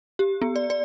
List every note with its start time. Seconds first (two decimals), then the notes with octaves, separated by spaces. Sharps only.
0.19 G4
0.42 B3
0.56 D5
0.70 D5